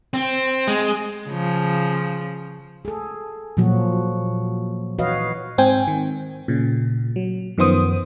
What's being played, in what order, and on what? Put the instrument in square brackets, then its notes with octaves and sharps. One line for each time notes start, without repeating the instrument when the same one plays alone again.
[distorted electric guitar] C4
G#3
[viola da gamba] C#3 F3
[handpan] G#4 A4
A#2 F3 F#3 F#4
E3 F#4 B4 C#5 D#5 F5
[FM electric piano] G#2 C4 G5 G#5
D#3
A#2 C#3
F#3
F#2 D#3 F3 B3 C5 D#6